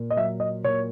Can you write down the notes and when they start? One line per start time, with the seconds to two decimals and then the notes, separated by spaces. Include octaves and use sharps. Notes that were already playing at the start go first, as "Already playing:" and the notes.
Already playing: A#2
0.10 D#5
0.17 F#3 E5
0.40 D#5
0.64 A#2 C#5